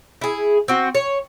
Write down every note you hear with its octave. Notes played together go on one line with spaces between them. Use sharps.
E4 G#4
C4 F#4
C#5